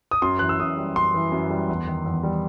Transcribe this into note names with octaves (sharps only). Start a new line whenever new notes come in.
D#6
F#2 C6
E3 F#6
E6
F#2 D#6
G3
F#2 C6
E3
F#2
G3
E2
D#3
E2
G3